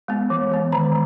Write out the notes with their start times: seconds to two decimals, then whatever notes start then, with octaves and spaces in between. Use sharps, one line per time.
0.08 G#3 B3
0.30 E3
0.52 G#3 B3
0.72 D#3 A#5